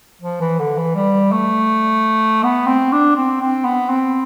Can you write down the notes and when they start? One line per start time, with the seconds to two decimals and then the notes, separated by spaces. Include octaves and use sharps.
0.22 F3
0.41 E3
0.59 D3
0.77 E3
0.95 G3
1.32 A3
2.43 B3
2.67 C4
2.92 D4
3.16 C4
3.41 C4
3.65 B3
3.90 C4